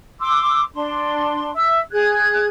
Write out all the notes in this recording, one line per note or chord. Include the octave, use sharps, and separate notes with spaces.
C6 D6 E6
D4 C6
E5 E6
G#4 F#6 G#6